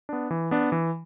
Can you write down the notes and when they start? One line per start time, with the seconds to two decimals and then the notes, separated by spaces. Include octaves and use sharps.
0.09 B3 D4
0.31 E3
0.51 B3 D4
0.72 E3